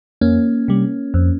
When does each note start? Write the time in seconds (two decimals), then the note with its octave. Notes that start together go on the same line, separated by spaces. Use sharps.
0.21 F2 A#3 C#4
0.68 C3 G3
1.14 F2